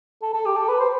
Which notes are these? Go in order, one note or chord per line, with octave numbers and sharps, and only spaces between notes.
A4
A4
G4
A4
B4
C5